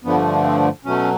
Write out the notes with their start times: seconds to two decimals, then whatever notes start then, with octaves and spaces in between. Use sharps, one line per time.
0.04 G2 D3 F3 A3 B3
0.44 C4
0.85 B2 F#3 A3 C#4